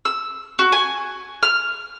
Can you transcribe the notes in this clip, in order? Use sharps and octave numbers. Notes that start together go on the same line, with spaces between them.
E6
F#4
G#5
F6